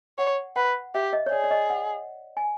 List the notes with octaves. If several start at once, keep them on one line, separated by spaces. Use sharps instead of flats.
C#5 F#5
B4 F#5
G4 E5
D#5
C#5
G#4 D5
D5
D#5
F#5
G#5